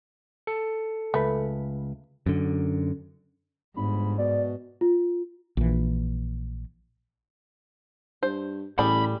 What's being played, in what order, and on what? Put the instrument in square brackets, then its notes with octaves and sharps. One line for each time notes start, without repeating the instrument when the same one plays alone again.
[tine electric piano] A4 C#7
[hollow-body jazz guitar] C#2 B4 [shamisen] A3
[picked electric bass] F#2 D3
[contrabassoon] G1 [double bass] G#2 [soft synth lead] B5
[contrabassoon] B2 [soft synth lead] D5
[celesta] F4
[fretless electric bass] A#1 E3
[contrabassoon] G2 [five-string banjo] C5
[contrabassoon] A1 [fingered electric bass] A2 [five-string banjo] G3 G#4 D5 [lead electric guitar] B5